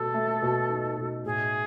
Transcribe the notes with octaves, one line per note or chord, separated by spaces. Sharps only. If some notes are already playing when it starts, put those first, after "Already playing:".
Already playing: B2 A3 A4
A3
B2
D#4
B2
A2 G#4